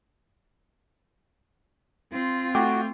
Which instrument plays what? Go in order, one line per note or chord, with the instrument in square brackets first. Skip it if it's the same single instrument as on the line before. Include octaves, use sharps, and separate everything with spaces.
[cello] C4 F4
[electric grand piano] A3 G5 D6 [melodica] F#4